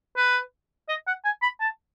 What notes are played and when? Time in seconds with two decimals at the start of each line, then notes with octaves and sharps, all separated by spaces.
0.17 B4
0.89 D#5
1.07 F#5
1.24 G#5
1.42 B5
1.60 A5